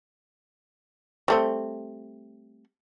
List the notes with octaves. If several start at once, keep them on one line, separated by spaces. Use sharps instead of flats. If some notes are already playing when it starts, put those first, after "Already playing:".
G3 A3 C4